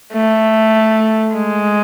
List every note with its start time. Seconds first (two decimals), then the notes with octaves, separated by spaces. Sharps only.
0.13 A3
1.35 G#3